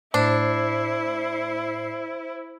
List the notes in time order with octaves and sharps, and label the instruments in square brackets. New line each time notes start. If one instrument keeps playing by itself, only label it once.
[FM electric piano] A2 C7 [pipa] D4 [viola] E4 [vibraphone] C5